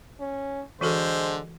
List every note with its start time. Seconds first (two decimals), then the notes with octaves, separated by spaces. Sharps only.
0.20 C#4
0.81 D3 E3 G#3 F#4 A4 C5